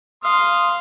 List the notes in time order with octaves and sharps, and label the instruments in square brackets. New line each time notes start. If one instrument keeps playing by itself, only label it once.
[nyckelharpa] F5 [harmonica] C6 D#6